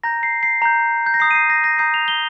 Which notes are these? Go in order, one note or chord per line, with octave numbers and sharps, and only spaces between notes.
A#5 G6 A#6
C7
C7
A#5 G6
G6
A#6
A#5 D#6 G6 C7
D#7
C7
A#6
A#6
A#5 D#6 G6 C7
F7
G7